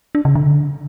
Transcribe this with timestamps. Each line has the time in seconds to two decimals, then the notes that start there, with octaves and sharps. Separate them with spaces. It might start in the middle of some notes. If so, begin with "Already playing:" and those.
0.15 D4
0.25 C#3
0.35 D3